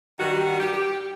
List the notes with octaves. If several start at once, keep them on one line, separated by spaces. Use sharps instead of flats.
G2 D#3 G3 F#4
G4
F#4
G4
G4